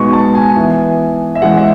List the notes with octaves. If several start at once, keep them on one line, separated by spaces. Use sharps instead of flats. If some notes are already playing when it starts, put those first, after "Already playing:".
Already playing: B2 G#3 B3 D#4 C#6
A5
G#5
E3 B3 E4
E5
E3 G#3 C#4 E4 F#5
E5